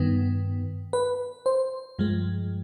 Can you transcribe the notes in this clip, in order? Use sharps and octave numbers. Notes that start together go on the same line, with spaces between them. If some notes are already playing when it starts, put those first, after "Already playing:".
Already playing: G2 D#3 B3
B4
C5
G2 F3 G#3